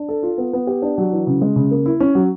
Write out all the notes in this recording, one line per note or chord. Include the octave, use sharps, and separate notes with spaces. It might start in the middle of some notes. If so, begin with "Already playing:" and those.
Already playing: D4
A4
F4
B3
B3
G4
D4
F#3
E3
C#3
G#3
C#3
A#3
E4
C#4
F#3